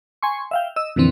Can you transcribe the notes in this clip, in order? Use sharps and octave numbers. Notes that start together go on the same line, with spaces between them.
G#5 C6 C#6
E5 F5 G5
D#5 E6
F2 A#2 D3 E3 C4